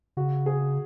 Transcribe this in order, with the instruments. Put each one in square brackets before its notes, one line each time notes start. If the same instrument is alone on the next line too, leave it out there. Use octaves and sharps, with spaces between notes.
[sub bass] C#3 [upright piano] F#4
[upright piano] G#4